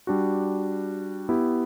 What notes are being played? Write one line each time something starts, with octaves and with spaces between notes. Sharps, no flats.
G3 D4 F#4
B3 E4 G4